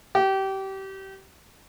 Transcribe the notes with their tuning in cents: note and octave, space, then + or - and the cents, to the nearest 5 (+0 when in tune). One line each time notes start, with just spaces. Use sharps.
G4 -25